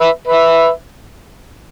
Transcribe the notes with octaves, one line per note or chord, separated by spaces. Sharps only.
B4 E5
B4 E5